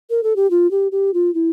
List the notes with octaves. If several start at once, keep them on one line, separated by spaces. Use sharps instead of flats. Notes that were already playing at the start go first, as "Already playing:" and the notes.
A#4
A4
G4
F4
G4
G4
F4
E4